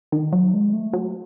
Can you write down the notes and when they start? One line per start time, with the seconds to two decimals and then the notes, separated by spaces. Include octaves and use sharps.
0.12 D#3
0.33 F#3
0.54 G#3
0.73 A3
0.93 F#3